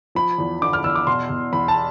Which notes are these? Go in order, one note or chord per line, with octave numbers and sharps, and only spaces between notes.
F3 B5
E2
D3 D6
F6
E2 E6
D6
B2 C6
B2
E2 B5
A5